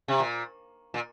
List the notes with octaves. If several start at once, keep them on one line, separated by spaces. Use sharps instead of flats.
C3
A#2
A#2